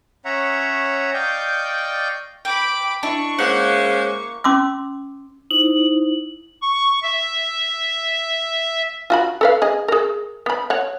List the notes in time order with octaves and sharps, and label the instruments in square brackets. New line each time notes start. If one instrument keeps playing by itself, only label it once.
[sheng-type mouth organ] C#4 C#5 E5 F#5 A#5
D5 D#5 F5 G5 C#6 G6
[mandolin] G5 [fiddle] B5 D6
[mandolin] D4 [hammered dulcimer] E4 D#5 [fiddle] C#6
[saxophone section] G#3 C#4 C5 [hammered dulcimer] A#3 [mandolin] F#5
[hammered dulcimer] F5 D6
[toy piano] C#4 C6 D6 E6
[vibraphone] D#4 E4 C5 [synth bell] F#7
[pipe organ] C#6
E5
[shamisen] F4 F#4 B5
A4 B4 F5
G#4 D#5
G#4 A#4
B3 B5
C#5 F#5